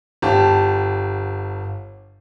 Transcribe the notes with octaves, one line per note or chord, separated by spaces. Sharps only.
G1 G4 A5